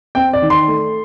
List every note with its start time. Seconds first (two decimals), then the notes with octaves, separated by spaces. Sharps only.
0.15 C4 G5
0.33 D5
0.42 D#3
0.50 C6
0.68 A3